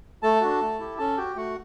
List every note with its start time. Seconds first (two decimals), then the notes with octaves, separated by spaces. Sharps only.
0.23 A3 A4 A5
0.41 D4 F#4
0.61 A3
0.79 E4 G4
0.98 C#4 A4 A5
1.17 F#4 G4 G5
1.36 A3 F#4 F#5